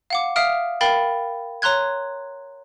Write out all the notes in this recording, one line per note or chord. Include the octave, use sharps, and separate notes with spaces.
F5 F#5 D6
E5 F5 D#6 F6 D7
A#4 F5 G5 B5 A6
C#5 A#5 C6 F#6 G#6